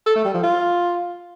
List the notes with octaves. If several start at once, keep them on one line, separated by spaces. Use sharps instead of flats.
A4
A3
G3
F3
F4